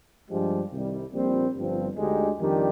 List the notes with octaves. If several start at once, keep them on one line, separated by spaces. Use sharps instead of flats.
G2 F3 G#3 D4 G4
C2 C3 D#3 G3
A#1 A#2 G3 C4
G1 G2 F3 C4
D2 D3 G#3 D#4 G4
F2 D#3 G3 D4 G4